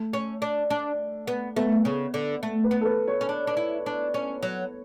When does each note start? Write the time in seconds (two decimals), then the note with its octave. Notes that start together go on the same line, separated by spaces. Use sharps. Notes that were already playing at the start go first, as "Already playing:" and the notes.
Already playing: A3
0.13 C#4
0.42 D4
0.70 D4
1.27 B3
1.56 A3 B3
1.85 C#3
2.14 D3
2.43 A3
2.64 B4
2.71 B3
2.81 A4
2.85 B4
3.08 C#5
3.21 C#4
3.29 D4
3.47 D4
3.57 E4
3.86 D4
4.14 C#4
4.43 F#3